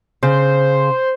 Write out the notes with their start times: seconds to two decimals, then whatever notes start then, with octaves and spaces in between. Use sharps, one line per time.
0.23 C#3 C5